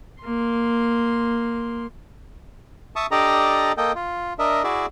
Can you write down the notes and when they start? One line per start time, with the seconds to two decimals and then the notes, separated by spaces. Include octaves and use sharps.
0.23 A#3 C6
2.96 E5 A5 C#6 D#6
3.11 D4 G4 A4 D5 D#5 A#5
3.77 A#3 A4 D#5 G5
3.95 F4
4.39 D4 A#4 D#5 E5
4.64 E4 F#4 G#4 D5 E5